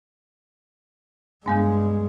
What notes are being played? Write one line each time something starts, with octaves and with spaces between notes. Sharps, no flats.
G2 G3 G#3 B3 D4